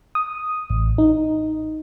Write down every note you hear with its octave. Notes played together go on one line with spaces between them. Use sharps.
D#6
A1
D#4